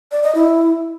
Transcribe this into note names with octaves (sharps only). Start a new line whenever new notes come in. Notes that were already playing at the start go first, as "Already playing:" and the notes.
D5
D#5
E4